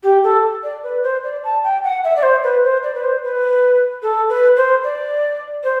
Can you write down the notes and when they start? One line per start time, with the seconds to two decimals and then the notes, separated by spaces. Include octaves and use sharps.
0.03 G4
0.24 A4
0.63 D5
0.84 B4
1.03 C5
1.24 D5
1.44 A5
1.64 G5
1.84 F#5
2.04 E5
2.16 D5
2.23 C5
2.44 B4
2.64 C5
2.83 D5
2.95 B4
3.04 C5
3.24 B4
4.02 A4
4.29 B4
4.57 C5
4.84 D5
5.63 C5